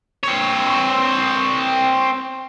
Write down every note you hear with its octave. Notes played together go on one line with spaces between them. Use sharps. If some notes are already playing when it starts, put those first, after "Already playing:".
C4 C#5